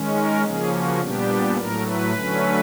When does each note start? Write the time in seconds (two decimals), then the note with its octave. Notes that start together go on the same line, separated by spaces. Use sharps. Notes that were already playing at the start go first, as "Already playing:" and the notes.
Already playing: D#3 G#3 C#4
0.16 A#4
0.45 C#3 F3 A#3 C#4 G#4
0.73 F#4
1.01 A#2 G3 B3 D4 G4
1.57 A2 F#3 A3 A#4
1.85 B4
2.14 D3 F#3 A3 C#4